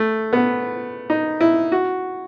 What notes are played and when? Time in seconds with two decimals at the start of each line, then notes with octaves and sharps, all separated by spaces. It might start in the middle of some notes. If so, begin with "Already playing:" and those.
Already playing: A3
0.33 B3
1.10 D#4
1.41 E4
1.72 F#4